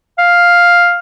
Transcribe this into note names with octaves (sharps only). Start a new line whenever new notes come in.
F5